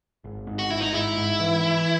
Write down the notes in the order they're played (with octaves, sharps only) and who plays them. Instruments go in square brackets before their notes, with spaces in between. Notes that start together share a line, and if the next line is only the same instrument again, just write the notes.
[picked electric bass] G#1
G#2
[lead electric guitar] F#4
[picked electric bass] G#1 [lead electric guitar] E4
[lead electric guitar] D#4
[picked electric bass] G#2 [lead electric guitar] E4
[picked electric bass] G#2
E3
E3